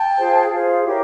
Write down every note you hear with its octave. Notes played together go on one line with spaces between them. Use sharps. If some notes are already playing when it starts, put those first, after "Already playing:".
Already playing: G5 A5
F4 G#4 C5
F4 G#4 C5
E4 G4 A#4 C#5